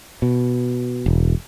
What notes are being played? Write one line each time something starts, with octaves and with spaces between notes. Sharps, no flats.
B2
E1